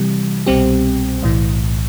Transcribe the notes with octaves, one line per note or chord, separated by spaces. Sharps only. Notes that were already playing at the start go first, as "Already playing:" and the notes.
Already playing: C3 E3 G3
C2 B2 G3 C4 G4
B1 A2 E3